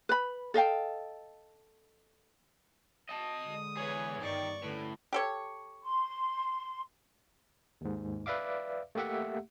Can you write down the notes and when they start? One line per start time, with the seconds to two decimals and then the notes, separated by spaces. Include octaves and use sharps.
0.09 B4 B5
0.54 A4 D#5 F5 G5
3.10 D#5 A5 D#6
3.45 D3 G#3
3.77 E2 G#4 B4 C#5
4.21 G1 G2 D#3 D5 C#6
4.63 A2 D3 C#4 B4
5.13 G4 A4 C#5
5.83 C6
7.81 D#2 G#2
8.26 B4 D5 E5 F5 D6
8.95 A3 A#3 G4 E5 F#5